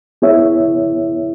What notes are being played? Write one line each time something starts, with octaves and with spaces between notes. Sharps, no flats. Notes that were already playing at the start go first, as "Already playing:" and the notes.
B3 E4 G#4 C#5 E5